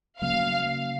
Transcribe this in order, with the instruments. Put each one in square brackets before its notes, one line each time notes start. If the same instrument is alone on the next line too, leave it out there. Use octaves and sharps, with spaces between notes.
[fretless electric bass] C#3 F#3 A#3 [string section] F5